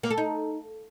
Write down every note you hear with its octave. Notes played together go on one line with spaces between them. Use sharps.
A#3
A4
D#4